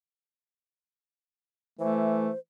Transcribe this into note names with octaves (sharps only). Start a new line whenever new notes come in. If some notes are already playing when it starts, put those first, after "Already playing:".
E3 A3 C5